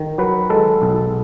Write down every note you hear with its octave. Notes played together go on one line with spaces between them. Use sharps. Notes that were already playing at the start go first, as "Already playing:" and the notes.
Already playing: D#3
F#3 B4
G#3 A4
B1